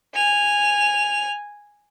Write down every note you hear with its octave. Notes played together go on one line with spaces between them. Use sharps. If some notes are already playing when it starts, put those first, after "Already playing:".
G#5 F7